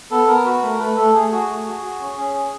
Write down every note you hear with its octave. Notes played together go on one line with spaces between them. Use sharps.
B3 A4
B3 A#4
F#4 B4
A3 A#4
A3 B4
A3 A4
A3 G#4
F#4 G#4
A3
F#4
F#4
C#4
C#4
G#4